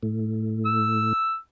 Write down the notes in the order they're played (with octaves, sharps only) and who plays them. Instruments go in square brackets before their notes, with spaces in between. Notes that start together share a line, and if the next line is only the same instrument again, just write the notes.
[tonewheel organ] A2
[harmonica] E6